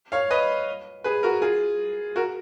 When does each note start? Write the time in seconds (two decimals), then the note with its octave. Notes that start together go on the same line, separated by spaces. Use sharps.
0.12 C#5 F5
0.31 B4 D#5
1.04 G#4 B4
1.23 F#4 A#4
1.42 F4 G#4
2.16 F#4 A#4